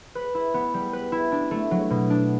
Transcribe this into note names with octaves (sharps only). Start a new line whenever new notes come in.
B4
E4
B3
G3
B4
E4
D4
A3
F#3
B2
D4